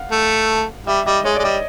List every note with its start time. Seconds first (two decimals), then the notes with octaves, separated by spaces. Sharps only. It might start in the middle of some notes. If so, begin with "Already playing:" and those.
Already playing: F5 F#5
0.12 A3
0.87 G3 E5
1.06 G3 D#5
1.24 G#3 C#5
1.35 D5
1.39 G#3
1.44 G3 D#5